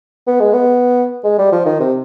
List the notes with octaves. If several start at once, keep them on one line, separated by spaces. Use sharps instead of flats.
B3
G#3
B3
G#3
G3
F3
D#3
C3